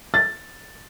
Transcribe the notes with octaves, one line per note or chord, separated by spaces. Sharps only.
A6